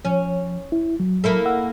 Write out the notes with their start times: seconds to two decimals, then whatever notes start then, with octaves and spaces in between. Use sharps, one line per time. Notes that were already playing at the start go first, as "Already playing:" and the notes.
0.05 F3 C#4
0.72 E4
1.00 F#3
1.24 A#3 E4 A4
1.46 F#5 E6